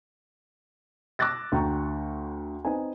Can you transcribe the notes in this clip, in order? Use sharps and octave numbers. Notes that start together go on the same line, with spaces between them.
D6 E6 F#6 A6 A#6
D2 G5 A#5 C#6
C4 D#4 B4 G#5